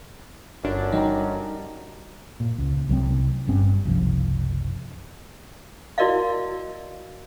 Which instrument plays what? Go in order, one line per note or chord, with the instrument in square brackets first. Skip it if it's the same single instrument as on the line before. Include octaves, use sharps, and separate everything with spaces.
[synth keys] G1 D4 [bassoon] F#2
[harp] G3 A#5 [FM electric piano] D#4
[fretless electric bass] A#2
C#2
C2 F#3 A3 C4
G1 G2 C4 C#4
F#1 C2 F3
[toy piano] E4 F#4 A#4 D5 D#5 F5